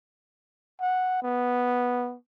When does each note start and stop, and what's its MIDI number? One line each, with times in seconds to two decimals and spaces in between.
0.81 1.19 78
1.22 2.15 59